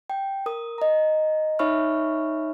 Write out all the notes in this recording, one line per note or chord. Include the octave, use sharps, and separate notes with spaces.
G5
A#4 D#6
D#5 A#5
D#4 C#5 E5 B5 C#6 F6